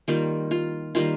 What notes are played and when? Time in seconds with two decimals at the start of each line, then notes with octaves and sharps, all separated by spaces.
0.08 D#3 G3 A#3 F4
0.51 F4
0.95 D#3 G3 A#3 F4